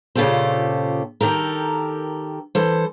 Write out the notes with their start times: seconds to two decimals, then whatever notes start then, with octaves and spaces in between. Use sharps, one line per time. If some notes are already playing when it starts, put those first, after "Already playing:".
0.15 A#2 C#3 F4 G4 A4 C5
1.21 D#3 G4 A4 A#4
2.55 E3 A4 C5